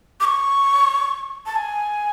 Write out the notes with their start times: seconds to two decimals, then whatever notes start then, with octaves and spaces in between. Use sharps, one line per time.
0.20 D6
0.25 C#6
1.46 A5
1.56 G#5